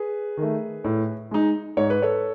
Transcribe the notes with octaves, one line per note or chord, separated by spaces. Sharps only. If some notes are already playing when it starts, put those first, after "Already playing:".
Already playing: G#4 B4
D#3 A3
A2
G#3 D#4
G#2 C#5
B4
A4 C#5